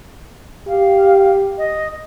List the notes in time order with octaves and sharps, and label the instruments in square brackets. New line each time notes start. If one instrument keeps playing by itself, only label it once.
[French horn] G4 [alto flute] F5
[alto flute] D#5